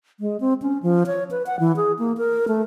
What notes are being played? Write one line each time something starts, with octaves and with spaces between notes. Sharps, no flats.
G#3
C4
C#4
F3
C#5
B4
F#5
E3
G#4
A#3
A#4
A3